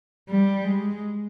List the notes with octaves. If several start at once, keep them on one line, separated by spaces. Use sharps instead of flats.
G3
G#3